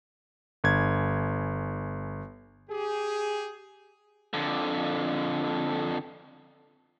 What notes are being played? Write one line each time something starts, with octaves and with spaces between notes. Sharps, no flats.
G1 G#6
G4 G#4
F2 D3